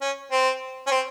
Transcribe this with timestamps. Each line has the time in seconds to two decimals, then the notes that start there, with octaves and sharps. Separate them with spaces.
0.01 C#4
0.32 C4
0.87 C#4
0.91 C4